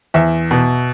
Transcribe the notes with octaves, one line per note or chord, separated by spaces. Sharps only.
E2 E5
B2